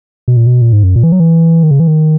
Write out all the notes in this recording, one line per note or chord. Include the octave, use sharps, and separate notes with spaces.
B2
A#2
B2
A#2
G#2
F#2
A#2
E3
F#3
E3
D#3
C#3
E3
D#3